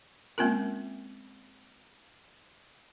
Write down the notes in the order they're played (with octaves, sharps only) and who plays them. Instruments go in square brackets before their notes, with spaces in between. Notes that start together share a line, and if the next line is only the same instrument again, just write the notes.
[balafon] G#3 A#3 C4 C#4 F4 A#4